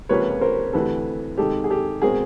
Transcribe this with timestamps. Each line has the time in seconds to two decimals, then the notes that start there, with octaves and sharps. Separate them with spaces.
0.09 C#2 C3 F3 A#3 B4 C#5
0.41 A#4 C5
0.73 D2 C3 E3 A3 A4 B4
1.38 C3 D#3 G#3 G4 A4
1.64 G#4
1.70 G4 A4
2.02 B2 G#3 C4 G#4 A#4